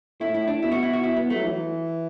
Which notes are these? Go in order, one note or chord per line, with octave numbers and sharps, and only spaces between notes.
A2 E4
E4
D4
B2 E4
F#4
E4
F#4
E4
B3
A3
F#3
E3